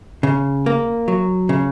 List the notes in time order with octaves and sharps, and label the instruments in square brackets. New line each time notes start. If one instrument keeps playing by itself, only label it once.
[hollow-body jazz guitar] C#3
A#3
F#3
C#3